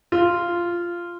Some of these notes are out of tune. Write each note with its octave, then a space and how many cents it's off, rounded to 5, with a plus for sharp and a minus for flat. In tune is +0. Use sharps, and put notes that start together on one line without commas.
F4 -10